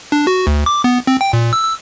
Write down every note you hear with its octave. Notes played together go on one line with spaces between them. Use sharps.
D4
F#4
D2
D6
B3
C4
G5
A#2
E6
E6